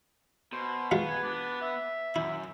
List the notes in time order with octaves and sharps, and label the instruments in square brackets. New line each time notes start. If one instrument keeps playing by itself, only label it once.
[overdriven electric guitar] B2 [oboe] C5
[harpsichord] F#3 G#3 F4 [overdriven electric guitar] B3
[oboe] G#5
D4
E5
[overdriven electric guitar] F#2 [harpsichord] E4